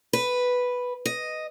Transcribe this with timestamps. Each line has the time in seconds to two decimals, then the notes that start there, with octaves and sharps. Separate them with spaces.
0.13 B4
1.06 D#5